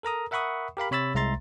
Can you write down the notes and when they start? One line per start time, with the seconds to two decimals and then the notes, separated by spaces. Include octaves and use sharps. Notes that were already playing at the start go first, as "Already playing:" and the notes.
0.03 A4 A#4 A#5 D#6
0.31 A#4 E5 F#5 B5 C#6 D#6
0.77 G4 A#4 F5 B5
0.91 C3 C#5 B5 E6 A6
1.15 C2 G#3 E5 A#5 C6 A6